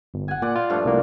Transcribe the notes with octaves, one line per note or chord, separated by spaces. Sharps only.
G1
F#5 G#5
A#2 D5 F#5
F4
G2 F3 A3
C2 A#3